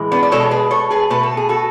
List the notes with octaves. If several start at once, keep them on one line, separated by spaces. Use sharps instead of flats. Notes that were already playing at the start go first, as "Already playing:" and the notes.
Already playing: A2 E3 G#3
B3 D4
D5
B2 G#3 A4 C#5
G#4 B4
A4 C#5
G#4 B4
B2 A3 B4
A4
G#4
F#4 A4